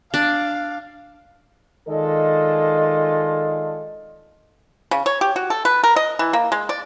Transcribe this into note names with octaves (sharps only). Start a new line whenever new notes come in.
D4 F5
D#3 G#3 D4 F4 A4 D#5
C#3
C#5
G4
F#4
A4
B4
A#4
D#5
E3
A#3
G#3
D5